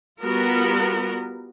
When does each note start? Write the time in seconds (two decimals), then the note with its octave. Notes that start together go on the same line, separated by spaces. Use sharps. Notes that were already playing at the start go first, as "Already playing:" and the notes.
0.23 G3 B3 F4 F#4 A#4